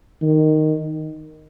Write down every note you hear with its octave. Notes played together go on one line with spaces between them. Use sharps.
D#3